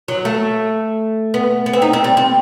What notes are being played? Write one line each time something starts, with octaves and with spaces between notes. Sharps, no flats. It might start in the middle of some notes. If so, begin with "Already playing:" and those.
F#3
A3
B3
B3
C4
D#4
C4
G3
C4